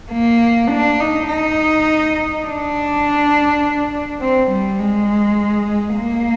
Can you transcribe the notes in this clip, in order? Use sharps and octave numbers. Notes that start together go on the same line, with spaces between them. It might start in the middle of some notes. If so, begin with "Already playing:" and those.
A#3
D4
D#4
D#4
D4
C4
G3
G#3
A#3